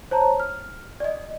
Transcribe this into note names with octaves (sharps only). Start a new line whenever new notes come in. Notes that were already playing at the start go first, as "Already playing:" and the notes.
C5 C#5 A5 A#5
F6
D5 D#5